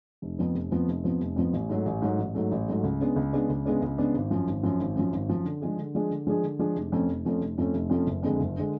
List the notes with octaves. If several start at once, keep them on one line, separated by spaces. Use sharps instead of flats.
F1
F2 F3 B3
F1
F2 F3 B3
F1
F2 F3 B3
F1
F2 F3 B3
A1
G#2 F#3 A3
A1
G#2 F#3 A3
A1
G#2 F#3 A3
A1
G#2 F#3 A3
C#2
C#3 G#3 B3 D4
C#2
C#3 G#3 B3 D4
C#2
C#3 G#3 B3 D4
C#2
C#3 G#3 B3 D4
G#1
F#2 F3
G#1
F#2 F3
G#1
F#2 F3
G#1
F#2 F3
D3
F3 G#3 D4 G#4
D3
F3 G#3 D4 G#4
D3
F3 G#3 D4 G#4
D3
F3 G#3 D4 G#4
F1
F2 F3 A3 C#4
F1
F2 F3 A3 C#4
F1
F2 F3 A3 C#4
F1
F2 F3 A3 C#4
F#1
F2 D3 G#3
F#1
D3 G#3